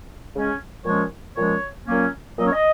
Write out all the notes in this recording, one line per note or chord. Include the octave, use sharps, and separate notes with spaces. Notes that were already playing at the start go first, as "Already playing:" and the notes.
C#3 G#3 C#4
A#2 F3 G#3 C#4 C#5
A#2 F3 G#3 C#4 C#5
A#2 F#3 A#3 C#4
A#2 F#3 A#3 C#4 D#5
C#5
D#5